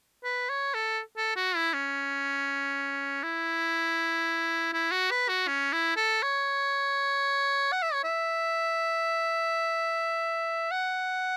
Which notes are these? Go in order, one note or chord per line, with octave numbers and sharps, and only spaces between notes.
B4
C#5
A4
A4
F#4
E4
C#4
E4
E4
F#4
B4
F#4
C#4
E4
A4
C#5
F#5
E5
C#5
E5
F#5